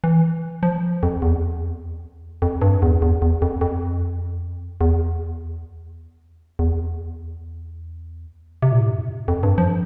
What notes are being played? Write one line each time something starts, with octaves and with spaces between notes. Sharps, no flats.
E3
F3
F2
E2
F2
G2
E2
E2
E2
F2
F2
E2
E2
C3
A#2
A2
G2
F2
F2
G2
F3